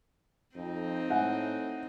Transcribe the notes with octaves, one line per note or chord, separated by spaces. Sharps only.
F2 C4 D#4
A2 E5 F#5 G#5